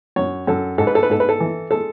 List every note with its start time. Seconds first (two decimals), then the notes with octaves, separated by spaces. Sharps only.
0.16 F#2 C#5
0.47 F#2 A4
0.78 G#2 A4
0.87 B4
0.95 A4
1.03 B4
1.10 G#2 A4
1.20 B4
1.29 A4
1.40 E3
1.70 G#3 A4